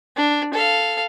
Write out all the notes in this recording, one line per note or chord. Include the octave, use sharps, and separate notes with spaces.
D4
A4 F5